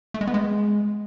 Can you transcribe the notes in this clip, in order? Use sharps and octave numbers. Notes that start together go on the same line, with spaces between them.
A3
G#3
B3
G#3